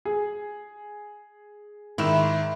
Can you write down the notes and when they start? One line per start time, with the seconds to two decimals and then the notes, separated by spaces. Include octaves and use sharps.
0.05 G#4
1.98 G#2 D#3 E4 E7